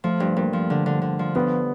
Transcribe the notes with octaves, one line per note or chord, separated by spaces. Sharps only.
F3 A3
G2
G2 A#3
F3
D3
D3
D3
F3
G2 B3